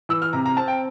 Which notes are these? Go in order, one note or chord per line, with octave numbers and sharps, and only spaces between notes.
E3 E6
F6
C3 A#5
A#5
C4 A5
G5